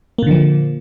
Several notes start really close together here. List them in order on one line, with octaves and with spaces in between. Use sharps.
A#3 A#2 D3 F3